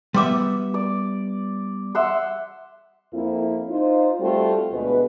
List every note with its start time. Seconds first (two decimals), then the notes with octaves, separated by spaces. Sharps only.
0.14 G3 B3 E5 C6 D6
0.74 D5
1.95 E5 F#5 C6
3.14 F2 A#3 C4 E4
3.69 D#4 F4 C5
4.20 G3 A3 C4 F4 F#4 A4
4.72 D2 B2 G#3 B4